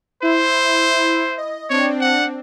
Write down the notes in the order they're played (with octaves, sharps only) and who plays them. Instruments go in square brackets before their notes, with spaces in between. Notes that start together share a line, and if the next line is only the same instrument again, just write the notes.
[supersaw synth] E4 [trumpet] C5
[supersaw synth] D#5
[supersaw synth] C4 D4 [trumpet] C#5
[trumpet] F#5